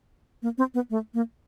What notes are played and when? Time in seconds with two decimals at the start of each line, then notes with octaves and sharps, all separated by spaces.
0.42 A#3
0.58 C4
0.74 B3
0.90 A3
1.14 A#3